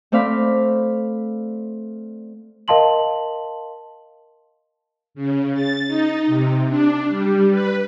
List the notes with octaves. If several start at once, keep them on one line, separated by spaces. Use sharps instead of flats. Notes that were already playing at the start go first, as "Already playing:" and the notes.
A3 C4 D5 F5 B5
A#4 D#5 F5 A5 C6 F#7
C#3
A6
D#4
C3
D4
G3
B4